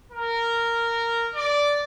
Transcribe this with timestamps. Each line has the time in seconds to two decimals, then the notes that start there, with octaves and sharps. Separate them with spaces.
0.11 A#4
1.35 D5